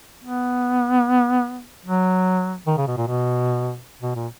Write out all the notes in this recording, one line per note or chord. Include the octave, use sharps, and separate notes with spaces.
B3
F#3
D#3
C#3
B2
A#2
B2
B2
A#2